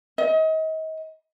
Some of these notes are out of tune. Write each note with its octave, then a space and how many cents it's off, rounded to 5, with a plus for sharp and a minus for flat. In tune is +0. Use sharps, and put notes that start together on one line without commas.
D#5 +35